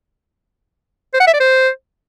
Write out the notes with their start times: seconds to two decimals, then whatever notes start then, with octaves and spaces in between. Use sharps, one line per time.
1.14 C5
1.20 F#5
1.27 E5
1.33 D5
1.40 C5